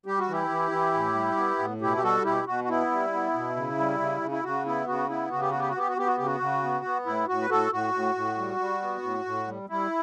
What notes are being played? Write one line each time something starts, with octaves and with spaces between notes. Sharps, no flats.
G3 G4
F#4
E3 E4 G4
E3
E3
A2
G3
B3
A2
B2 E4 G4
G4
G3 F#4 A4
B2 E4 G4
B2 F#4
F#4
B3 E4
G3
B3
B2
C#3
G3
C#3
C#3
E4
C#3 F#4
B3 E4
C#3 F#4
B3 E4
C#3 F#4
G4
B3 F#4
G4
F#4
B3 G4
F#4
B3 G4
F#4
C#3 G4
F#4
C#3
B3
B3
A2 E4
A2 F#4
B4
A2 F#4 A4
A2 F#4
A2
A2
G3
G3
B3
A2
A2
G3
G3 E4